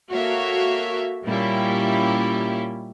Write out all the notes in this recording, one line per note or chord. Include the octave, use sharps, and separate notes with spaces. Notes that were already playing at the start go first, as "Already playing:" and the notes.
A#3 F#4 A4 C#5 E5 F5
A#2 G3 A#3 C#4 E4 G4